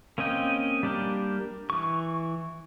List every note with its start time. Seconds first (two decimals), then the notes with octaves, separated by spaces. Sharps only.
0.18 A#3 C4 C#4 D#5 G5
0.83 G3 A#3 D4 G4 A#4
1.70 E3 C#6